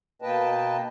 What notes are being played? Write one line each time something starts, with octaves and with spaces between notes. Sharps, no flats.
B2 A#3 B4 D#5 G5 A5